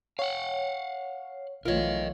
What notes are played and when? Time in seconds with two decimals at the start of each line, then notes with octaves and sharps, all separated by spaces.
0.19 C#5 F5 F#5
1.65 B1 E3 A3 F4 A#4 C#5 D#5